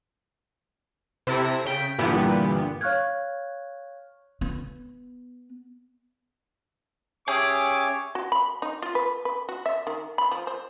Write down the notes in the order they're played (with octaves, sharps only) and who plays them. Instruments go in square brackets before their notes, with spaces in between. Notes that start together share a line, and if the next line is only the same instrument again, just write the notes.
[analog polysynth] C3 E4 A4 A#6
C#3 G5 B6
G2 A#2 D3 E3 B3 G4
[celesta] C#5 F5 C#6 F6 F#6 G#6
[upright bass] B3
[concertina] C#4 C#5 [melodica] G4 E5 D#6 [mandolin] G#4 [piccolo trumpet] D6
[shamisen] F#4
B5
D#4
F4
B4
B4
F#4
E5
D#3
B5
F3
C5